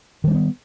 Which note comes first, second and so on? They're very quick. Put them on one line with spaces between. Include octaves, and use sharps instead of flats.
D#3 G3 D4 B3